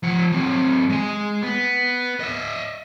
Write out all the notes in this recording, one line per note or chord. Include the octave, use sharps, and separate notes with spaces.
F3 F#5
F#3 C4
G#3 G#5
B3
D#5 E5